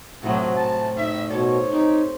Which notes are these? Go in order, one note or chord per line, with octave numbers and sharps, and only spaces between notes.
A2 C3 F3 F#3 F#4
A2 A5
D#4 E5
B2 F3 A4 C#5
C4 D#4 G4